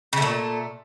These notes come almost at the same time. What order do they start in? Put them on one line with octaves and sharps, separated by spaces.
C#3 A3 A#2